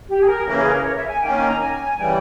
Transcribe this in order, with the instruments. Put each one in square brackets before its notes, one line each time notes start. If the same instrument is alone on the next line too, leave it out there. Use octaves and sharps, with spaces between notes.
[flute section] G4
G#4
A#4
[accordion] C#3 E3 A#3 C#4 [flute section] A#4
[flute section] G#4
A#4
C#5
E5
G#5
[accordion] D#3 A#3 C#4 [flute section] G5
[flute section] G#5
A#5
G#5
[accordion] C#3 E3 G3 [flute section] G5